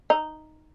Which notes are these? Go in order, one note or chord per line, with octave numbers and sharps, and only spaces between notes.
D#4